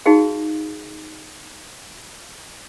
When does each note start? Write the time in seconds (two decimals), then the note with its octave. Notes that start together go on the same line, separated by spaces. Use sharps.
0.06 D#4 F#4 G#4 F5